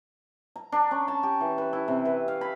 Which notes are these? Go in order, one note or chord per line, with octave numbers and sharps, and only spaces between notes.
A#5
D4
C#4
A5
G4
E3
B4
E4
C3
B4
F5
B5